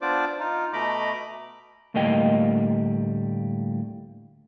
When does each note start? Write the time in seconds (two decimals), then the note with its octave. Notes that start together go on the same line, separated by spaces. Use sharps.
0.02 B3 D4 F4 C5 D5 D6
0.39 D#4 F4
0.73 B2 A3 D#5 A#5 B5 D6
1.94 D2 A2 G3 A#3 D#5 G5